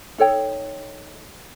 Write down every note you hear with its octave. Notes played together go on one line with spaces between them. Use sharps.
D#4 A4 C#5 G5